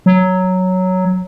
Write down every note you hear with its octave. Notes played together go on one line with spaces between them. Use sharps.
F#3